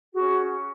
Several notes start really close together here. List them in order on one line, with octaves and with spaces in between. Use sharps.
G#4 F#4 C#4